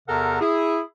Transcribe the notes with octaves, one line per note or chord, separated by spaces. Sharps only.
E2 C3 A4 A#4 F#5 A#5
E4 G#4